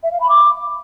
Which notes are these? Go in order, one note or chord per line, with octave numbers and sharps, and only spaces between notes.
E5
F5
B5
D6